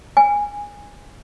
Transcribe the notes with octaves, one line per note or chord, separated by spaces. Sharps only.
G#5